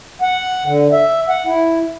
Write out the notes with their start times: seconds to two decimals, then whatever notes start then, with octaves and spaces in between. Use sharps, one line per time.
0.22 F#5
0.66 D3
0.92 E5
1.29 F#5
1.46 E4